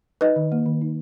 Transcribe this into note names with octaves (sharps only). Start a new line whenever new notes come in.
D#4 B4 D#5
D#3
A#3
D#3
D#4